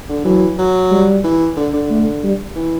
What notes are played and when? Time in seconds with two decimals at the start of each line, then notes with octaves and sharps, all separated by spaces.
0.09 D3
0.25 E3 F#3
0.58 F#3
0.91 G3
1.24 E3
1.57 D3
1.73 D3
1.90 A3
2.23 G3
2.56 E3